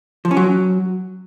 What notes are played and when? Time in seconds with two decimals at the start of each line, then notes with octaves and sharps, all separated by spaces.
0.25 F3
0.31 C#4
0.37 F#3